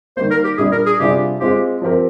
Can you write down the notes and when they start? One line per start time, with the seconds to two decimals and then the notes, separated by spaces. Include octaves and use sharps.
0.17 D#3 G3 A#3 C5
0.31 A#4
0.44 G4
0.58 A#2 G3 D4 G#4
0.72 A#4
0.86 G#4
0.99 C3 G3 D4 F4 G4 G#4
1.40 G#3 C4 F4 G4
1.82 F3 C4 G4 A#4